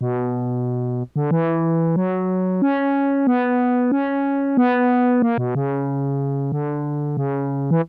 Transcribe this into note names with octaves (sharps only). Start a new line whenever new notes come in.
B2
D3
E3
F#3
C#4
B3
C#4
B3
A#3
B2
C#3
D3
C#3
E3